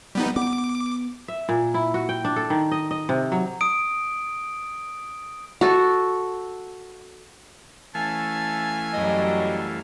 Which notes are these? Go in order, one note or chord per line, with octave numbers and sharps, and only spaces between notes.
G3 B3 D#4
B3 D6
E5
A#2
E4
F#4
G5
D4
A4
D#3
D#5
D#5
C3
F#3
D#6 D7
F#4 A4
E3 A3 C#4 F5 G#5 A5
F#2 F#3 G3 D#5